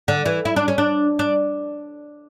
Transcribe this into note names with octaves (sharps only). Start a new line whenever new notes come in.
D3
E3
E4
D4
C#4
D4
D4